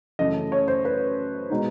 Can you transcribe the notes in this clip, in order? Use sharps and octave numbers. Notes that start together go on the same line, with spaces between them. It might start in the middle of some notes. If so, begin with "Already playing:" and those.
F#2 C#3 E3 A3 D#5
C#5
C5
B4
B2 G#3 B3 D#4